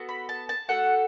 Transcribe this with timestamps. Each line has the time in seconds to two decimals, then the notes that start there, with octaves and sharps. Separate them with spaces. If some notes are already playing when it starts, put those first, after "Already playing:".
Already playing: B3 F#4 A4
0.09 B5
0.29 A5
0.49 A5
0.69 A3 F#4 A4 F#5